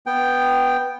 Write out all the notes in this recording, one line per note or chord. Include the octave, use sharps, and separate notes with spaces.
B3 G5